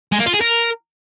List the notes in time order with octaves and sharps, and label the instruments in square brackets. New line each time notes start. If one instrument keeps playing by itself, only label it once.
[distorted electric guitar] G#3
A#3
F4
G#4
A#4